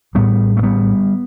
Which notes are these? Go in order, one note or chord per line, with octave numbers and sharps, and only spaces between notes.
A1 A2 G3 B3
A3
G3 B3